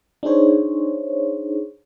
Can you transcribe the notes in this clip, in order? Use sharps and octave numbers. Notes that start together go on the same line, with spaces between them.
D4 D#4 G#4 C5 C#5